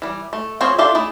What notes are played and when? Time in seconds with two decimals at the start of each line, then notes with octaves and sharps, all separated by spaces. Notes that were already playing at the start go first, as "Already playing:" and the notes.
0.02 E3 G3
0.33 A3
0.60 F3 C4 G#4 C5 C#5
0.78 D4 F4 G4 A4 E5
0.95 A3 E4 G#4